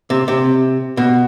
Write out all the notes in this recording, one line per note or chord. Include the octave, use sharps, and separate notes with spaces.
C3
C3
B2